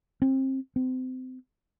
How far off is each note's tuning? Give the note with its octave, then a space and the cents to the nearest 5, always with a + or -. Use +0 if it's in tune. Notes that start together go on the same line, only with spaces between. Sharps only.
C4 +25
C4 -30